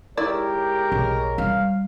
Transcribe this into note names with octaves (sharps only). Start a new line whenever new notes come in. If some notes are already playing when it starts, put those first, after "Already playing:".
D#3 G#3 E4 G4 A#4 C#5 D5
B1
G3 F5